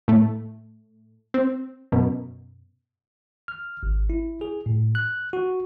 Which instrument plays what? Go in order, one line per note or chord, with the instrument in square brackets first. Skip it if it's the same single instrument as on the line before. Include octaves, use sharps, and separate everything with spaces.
[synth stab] A2 A3
C4
F#2 B2
[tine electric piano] F6
G#1
E4
G#4
A2
F#6
F#4